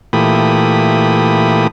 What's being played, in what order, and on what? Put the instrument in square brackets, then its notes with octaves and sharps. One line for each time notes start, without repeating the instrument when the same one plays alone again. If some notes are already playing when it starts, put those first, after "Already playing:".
[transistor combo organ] A#2 E3 A3 G4 B5 D#6